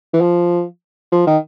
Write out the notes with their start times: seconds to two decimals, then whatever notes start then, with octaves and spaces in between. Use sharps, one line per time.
0.13 E3
0.21 F3
1.12 F3
1.27 D#3